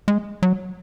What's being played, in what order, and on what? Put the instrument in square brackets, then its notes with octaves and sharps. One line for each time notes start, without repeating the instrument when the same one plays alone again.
[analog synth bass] G#3
F#3